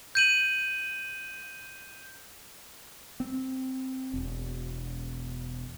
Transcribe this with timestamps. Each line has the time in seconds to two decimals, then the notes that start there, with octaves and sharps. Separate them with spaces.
0.15 G6 D#7 F#7
3.20 C4
4.14 E1